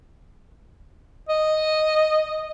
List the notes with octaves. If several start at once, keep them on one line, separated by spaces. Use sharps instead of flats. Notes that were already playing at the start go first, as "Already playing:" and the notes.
D#5